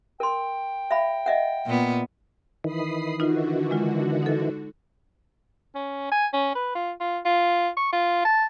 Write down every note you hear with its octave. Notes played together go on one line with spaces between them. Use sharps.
A#4 G5 C6
E5 F5 B5
D#5 E5 F#5
A#2 B3
D#3 E3 B5 D#6 C7
D3 D#4 F4 F#4
G#3 F4
D#4 A4
C#4
G#5
C#4
B4
F4
F4
F4
C#6
F4
A5